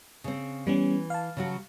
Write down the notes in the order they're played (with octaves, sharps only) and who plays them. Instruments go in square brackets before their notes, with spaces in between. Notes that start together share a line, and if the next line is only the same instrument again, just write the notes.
[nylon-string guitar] C#3 C4
[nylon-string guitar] E3 [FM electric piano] G3 B3 C#4
[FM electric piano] F5 A5
[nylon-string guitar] C#3 F#3 F#4